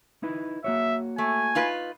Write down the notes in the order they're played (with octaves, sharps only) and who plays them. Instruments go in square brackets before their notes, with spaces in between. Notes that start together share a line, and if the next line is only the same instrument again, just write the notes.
[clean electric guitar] D#4 E4 B4
[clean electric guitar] A#3 F#4 C#5 [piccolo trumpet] E5
[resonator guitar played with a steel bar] A3 [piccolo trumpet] G#5
[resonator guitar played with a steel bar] D#4 F4 B4